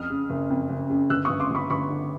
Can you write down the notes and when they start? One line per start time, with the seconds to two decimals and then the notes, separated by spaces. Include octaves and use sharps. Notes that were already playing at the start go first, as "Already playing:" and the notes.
Already playing: F2 D#6 F6
0.10 C#3
0.30 F#1
0.50 F2
0.70 F#1
0.90 C#3
1.10 G1 E6 F#6
1.25 G1 C#6 D#6
1.40 C6 D6
1.51 G1 B5 C#6
1.70 G1 B5 C#6
1.90 D3